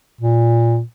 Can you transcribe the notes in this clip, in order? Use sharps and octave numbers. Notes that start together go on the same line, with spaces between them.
A#2